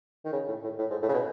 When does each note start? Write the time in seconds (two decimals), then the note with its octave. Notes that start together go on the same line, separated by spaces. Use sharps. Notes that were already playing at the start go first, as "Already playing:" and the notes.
0.25 D#3
0.33 C#3
0.48 A2
0.63 A2
0.79 A2
0.91 G#2
1.03 A2
1.09 C#3
1.14 B2